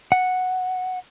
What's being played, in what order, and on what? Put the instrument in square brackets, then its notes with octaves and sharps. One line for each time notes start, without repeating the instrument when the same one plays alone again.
[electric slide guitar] F#5